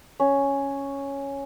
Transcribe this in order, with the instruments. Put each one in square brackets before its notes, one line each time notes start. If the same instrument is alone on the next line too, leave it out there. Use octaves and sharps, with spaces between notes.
[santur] C#4